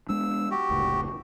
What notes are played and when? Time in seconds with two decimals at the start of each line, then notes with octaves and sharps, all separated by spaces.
0.09 G#3 B3 D4 E6
0.51 F#4 G4
0.69 F1 C#2 A2